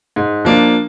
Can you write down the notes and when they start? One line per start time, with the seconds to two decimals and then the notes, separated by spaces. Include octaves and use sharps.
0.16 G#2
0.45 F3 A#3 D4